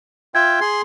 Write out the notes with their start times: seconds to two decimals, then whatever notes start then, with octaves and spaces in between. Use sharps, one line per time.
0.35 F4 E5 G5 G#6
0.61 G#4 C6